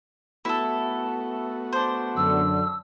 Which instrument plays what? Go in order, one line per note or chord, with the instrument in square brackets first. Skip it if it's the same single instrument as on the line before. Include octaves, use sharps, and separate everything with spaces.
[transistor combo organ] A3 B3 F#4 [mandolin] E4 A4
[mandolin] D4 C5
[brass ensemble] F#2 D3 [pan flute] E6